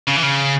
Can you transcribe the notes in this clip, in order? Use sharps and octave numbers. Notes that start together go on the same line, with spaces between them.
C#3
E3
C#3